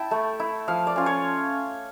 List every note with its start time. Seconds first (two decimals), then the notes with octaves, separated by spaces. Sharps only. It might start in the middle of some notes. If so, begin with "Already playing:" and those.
Already playing: E4 G5 A5
0.11 A3
0.40 E4
0.68 F3 F5
0.87 D5
0.96 C#4 F4
1.06 C#5